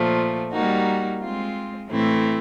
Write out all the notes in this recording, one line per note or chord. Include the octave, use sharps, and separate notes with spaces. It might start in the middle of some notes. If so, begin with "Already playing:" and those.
Already playing: A#2 F3 A3
G3 A#3 D#4 F#4
G#3 C4 F4
A2 E3 A3 C4 E4